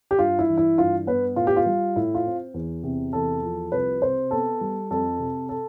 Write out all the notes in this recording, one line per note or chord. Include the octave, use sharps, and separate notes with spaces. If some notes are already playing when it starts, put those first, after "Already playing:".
G4
G2 F4
E4
E3
E4
G2 F4
B3 B4
A2 F4
G4
F4
G3
A2 E4
F4
C4
E2
C3
E2 A4
F3
C2 B4
C3 C5
B3 A4
G3
F2 A4
C3
A4